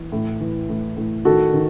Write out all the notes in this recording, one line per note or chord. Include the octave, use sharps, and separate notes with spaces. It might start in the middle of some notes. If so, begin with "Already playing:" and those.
Already playing: E3
A2
E3
A2
A2
D#3 F#4 A4
D#3